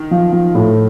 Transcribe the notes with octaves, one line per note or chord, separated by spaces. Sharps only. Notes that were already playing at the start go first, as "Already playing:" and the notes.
Already playing: D#3
F3
F3
A2